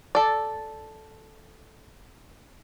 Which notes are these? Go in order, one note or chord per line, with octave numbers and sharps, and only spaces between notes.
A4 D5